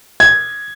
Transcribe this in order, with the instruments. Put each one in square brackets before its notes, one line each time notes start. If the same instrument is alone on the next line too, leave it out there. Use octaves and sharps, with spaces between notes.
[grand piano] G#6